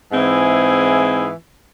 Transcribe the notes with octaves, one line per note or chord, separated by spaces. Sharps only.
G#2 E3 C4 E4 G#4